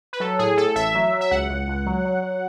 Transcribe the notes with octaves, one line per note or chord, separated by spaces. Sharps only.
B4
F#3 A4
A2 G#4
A2 A4
A1 E5
F#3
F#3
E5
C#2 F#5
C#2
C#2
F#3
F#3
F#3